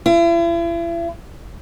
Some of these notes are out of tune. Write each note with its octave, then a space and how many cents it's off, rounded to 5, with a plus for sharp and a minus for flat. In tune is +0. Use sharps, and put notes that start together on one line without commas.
E4 +40